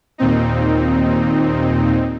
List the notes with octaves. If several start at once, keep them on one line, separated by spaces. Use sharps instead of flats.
D#2 A#2 C4 D#4